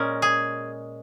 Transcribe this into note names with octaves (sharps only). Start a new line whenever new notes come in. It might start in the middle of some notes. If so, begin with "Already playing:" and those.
Already playing: A#2 G#3 C#4 A#4
G#4